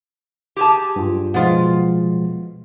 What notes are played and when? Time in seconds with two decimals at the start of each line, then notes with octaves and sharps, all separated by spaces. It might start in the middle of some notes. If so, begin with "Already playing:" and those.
0.57 G4 G#4 A5
0.96 G2 F4
1.34 B2 F3 G#3 B3 F4